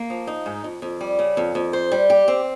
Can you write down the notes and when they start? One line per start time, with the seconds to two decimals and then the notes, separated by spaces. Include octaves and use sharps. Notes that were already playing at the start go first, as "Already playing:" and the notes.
Already playing: A#3
0.10 F3
0.27 D#4
0.46 G#2
0.64 F2
0.82 F2
1.01 G3
1.19 C#3
1.37 F2
1.55 F2
1.73 C5
1.92 G3
2.10 G4
2.28 C4